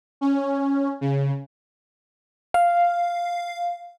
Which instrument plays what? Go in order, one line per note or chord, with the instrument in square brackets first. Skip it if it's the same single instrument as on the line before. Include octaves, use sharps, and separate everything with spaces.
[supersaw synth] C#4
C#3
[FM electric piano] F5